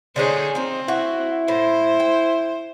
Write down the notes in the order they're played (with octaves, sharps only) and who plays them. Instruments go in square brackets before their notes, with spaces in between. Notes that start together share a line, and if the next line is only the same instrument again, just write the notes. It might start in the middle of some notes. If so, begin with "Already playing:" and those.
[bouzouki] D3 G#3 C#4 [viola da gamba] D#4 G#4 C5
[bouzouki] F3 D#4 [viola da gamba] C4
[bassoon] E4 [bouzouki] F#4
[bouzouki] A2 [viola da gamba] C5
[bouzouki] G5